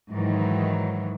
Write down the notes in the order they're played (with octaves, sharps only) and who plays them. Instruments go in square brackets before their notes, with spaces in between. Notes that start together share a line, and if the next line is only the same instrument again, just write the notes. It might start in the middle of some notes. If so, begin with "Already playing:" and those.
[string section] G#2 D#3 E3 F#3